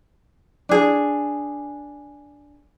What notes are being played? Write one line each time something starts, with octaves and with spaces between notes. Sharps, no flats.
D4 G#4